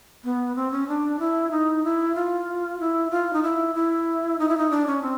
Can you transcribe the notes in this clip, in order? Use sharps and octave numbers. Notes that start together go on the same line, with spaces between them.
B3
C4
C#4
D4
E4
D#4
E4
F4
E4
F4
D#4
E4
E4
D#4
E4
D#4
D4
C#4
C4